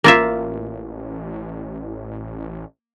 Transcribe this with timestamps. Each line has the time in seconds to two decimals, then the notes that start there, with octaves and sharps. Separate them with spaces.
0.04 A1 A#3 F4 E5